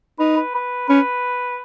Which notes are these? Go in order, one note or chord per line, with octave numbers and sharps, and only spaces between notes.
D#4 B4
B4
B4
C#4 B4